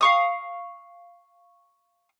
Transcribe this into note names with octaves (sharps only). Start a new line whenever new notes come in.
F5 C#6 D#6